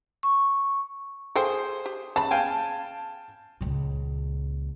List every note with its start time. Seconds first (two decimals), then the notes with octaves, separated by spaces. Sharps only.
0.23 C#6
1.35 G#4 A4 C5 F5 G5
1.86 G4
2.16 C#3 A5 B5
2.31 F5 G5 G#5
3.61 C#2 A#2